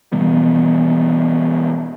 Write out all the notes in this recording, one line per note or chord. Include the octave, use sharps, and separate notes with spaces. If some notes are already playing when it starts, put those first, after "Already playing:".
B2 E3 G3 B3